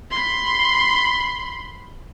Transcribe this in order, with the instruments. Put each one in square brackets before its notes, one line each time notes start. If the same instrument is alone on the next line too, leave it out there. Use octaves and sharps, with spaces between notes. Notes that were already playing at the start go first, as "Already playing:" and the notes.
[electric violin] B5 C6